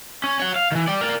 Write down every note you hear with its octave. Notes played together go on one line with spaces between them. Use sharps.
C#4
C#5 F#5
F5
D#3 E3
D5 G5
A#4 D5